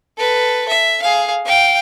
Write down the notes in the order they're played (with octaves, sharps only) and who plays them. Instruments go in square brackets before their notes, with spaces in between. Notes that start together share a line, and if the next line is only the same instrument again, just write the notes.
[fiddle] A4 B4
E5
G#4 F5
F5 G5